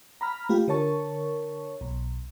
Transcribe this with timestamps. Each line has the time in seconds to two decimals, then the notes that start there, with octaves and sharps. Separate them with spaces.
0.21 A#5 B5 F6
0.49 A3 F4 G4
0.68 D3 A#4 C#5 A5 C#6
1.81 B1